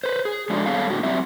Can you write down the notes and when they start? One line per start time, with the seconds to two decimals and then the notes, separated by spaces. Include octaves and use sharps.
0.04 B4 C5
0.25 G#4
0.50 F3 G#3 A3 D4 F#4
0.66 G3 B3 G#4 A4 C#5 F5
0.90 A2 D3 F#4
1.03 F#3 C4 E4 G4 E5